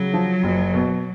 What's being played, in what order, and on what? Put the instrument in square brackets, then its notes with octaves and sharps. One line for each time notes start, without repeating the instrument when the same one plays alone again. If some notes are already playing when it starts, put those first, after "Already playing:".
Already playing: [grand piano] C#3 [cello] F#3
[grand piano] F3
F#1
B2